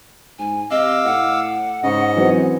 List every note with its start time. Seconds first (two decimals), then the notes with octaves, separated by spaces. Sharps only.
0.39 G#2 G#5
0.71 C3 D#5 F5 D6 E6
1.05 A2 F#5
1.83 G#2 C#3 D#5
2.16 F#2 E3 F#3 C4